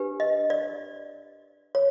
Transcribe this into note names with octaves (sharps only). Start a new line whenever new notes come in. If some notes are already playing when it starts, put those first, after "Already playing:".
Already playing: D4 G4 B4
D#5
D5
C#5